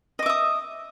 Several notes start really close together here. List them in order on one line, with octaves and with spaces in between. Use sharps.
D#5 D6 E5 D#6